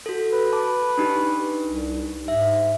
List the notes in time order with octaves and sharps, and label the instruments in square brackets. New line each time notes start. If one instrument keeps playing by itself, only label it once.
[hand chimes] F#4 A4
[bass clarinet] B4
[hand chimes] A5 D6
D4 D#4 G4
[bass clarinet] C2
[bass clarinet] G#2 [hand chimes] E5